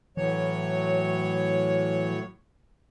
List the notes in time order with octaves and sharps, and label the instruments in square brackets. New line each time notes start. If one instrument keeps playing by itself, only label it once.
[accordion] A2 F#3 C#5 [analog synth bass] E3